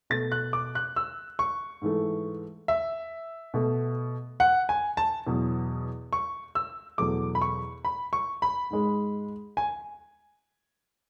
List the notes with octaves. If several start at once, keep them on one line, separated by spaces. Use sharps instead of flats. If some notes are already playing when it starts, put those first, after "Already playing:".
B2 A3 A6
F#6
D6
F#6
E6
C#6
G#2 E3 A3
E5
B2 A3
F#5
G#5
A5
E2 B2 F#3
C#6
E6
E2 B2 F#3 A3 D6
B5
C#6
B5
C#6
B5
G#2 G#3
G#5